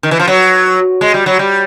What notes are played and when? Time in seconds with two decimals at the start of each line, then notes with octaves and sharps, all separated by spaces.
0.03 D#3
0.11 E3
0.19 F3
0.28 F#3
1.01 G#3
1.14 G3
1.26 F#3
1.39 G3